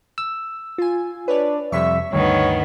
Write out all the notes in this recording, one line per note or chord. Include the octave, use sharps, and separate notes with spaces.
E6
F4 G#5
D4 B4 C#5 D5
F2 C3 G3 E5 C#6 B6
D2 G2 D#3 B3 C#5